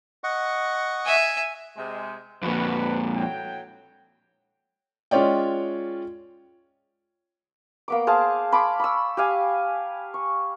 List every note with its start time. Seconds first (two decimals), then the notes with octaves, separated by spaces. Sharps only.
0.24 D#5 F#5 C#6
1.06 E5 G#5
1.77 C3 G#3
2.43 F2 A#2 F#4 B4
3.16 A2 F#3 G5
5.11 G#3 C#4 F4 C#5 D5 G5
7.88 A#3 B3 D6
8.07 G#4 C5 F5 A5
8.52 A5 B5 C6 D6
8.80 B5 C#6 E6
9.17 G4 F5 G#5
10.14 C#6